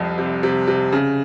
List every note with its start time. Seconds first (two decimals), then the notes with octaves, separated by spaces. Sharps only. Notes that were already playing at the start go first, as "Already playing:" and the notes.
Already playing: C2 F2
0.18 C3
0.43 C3
0.67 C3
0.92 C#3